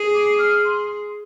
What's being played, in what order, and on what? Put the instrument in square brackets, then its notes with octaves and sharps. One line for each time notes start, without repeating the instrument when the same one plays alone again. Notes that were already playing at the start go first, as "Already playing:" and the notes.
Already playing: [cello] G#4
[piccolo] D6
F6
C6